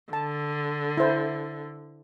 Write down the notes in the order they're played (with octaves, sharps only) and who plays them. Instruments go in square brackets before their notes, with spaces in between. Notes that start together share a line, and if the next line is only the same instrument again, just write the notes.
[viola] D3 [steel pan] A5
[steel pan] E4 C5